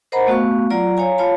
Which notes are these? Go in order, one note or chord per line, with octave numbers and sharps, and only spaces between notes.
A#4 C5 D#5 F#5 A#5 B5
A3 B3 F#4 F5 C#6
F#3 F4 D5 A#5
C#5 F5 G#5 A#5
F4 C#5 F5 A5 B5